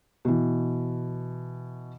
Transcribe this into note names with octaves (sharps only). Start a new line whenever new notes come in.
B2 E3